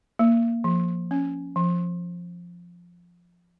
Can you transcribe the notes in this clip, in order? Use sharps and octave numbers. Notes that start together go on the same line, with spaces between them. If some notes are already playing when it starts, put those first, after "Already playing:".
A#3
F3
C#4
F3